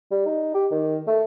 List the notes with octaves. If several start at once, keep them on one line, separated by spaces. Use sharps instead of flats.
G3
D#4
G4
D#3
A3